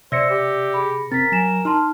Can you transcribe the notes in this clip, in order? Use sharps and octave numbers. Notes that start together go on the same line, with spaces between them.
C3 C5 D5 E5 E6 A#6 C#7
G4
G#4 B5
C4 A#4 A6 B6
F#3 G#5 A#6 E7
D#4 A5 C6 F6